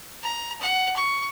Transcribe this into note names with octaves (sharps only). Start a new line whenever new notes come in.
A#5
F#5
C#6